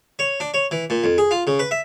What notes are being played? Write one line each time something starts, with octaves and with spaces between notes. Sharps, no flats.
C#5
D4
C#5
E3
A#2
F2
G#4
F4
C#3
B4
E5